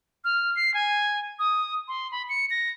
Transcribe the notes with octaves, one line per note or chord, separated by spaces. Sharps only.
F6
C7
G#5
D#6
C6
B5
C#7
A#6